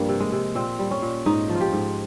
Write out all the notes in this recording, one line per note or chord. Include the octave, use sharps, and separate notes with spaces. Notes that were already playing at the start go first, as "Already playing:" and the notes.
Already playing: G2 F3 G3 A#3
C3
G#3
C3
A#2 C4
G3
C#4
A#2
G#2 D#4
F3
F4
G4
G#2